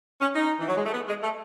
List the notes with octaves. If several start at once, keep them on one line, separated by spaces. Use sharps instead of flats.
C#4
D#4
E3
F#3
G#3
A3
B3
G#3
A3